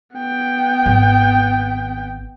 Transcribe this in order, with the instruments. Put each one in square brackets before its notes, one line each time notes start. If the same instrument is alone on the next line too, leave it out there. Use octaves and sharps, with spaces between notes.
[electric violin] B3 G5
[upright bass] G#1 D#3